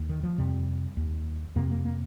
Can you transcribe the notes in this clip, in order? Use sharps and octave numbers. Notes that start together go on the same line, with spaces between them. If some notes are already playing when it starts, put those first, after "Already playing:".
Already playing: D#2
D#3
F3
F2 C3 G3
D#2
F2 C3 A#3
A#3
A#3